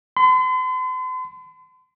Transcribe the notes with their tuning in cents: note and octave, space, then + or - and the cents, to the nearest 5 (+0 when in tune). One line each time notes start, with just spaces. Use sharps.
C6 -45